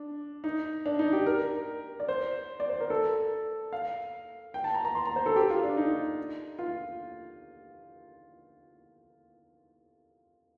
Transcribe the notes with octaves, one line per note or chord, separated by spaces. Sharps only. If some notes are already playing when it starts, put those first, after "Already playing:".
Already playing: D4
D#4
D4
D#4
G4
A#4
D5
C5
D5
C5
A#4
A4
F5
G5
A5
A#5
A#5
C6
A#5
C5
A4
G4
F4
D4
D#4
F4